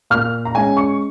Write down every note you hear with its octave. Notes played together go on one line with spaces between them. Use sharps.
A#2 F6
A#5
G#3 C#4 G#5
C#6